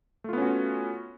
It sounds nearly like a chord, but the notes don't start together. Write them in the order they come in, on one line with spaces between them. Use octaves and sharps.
A3 F4 B3 C#4 F#4